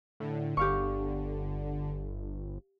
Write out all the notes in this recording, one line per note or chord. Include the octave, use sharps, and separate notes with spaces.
A2 D3
G1 G4 F5 C#6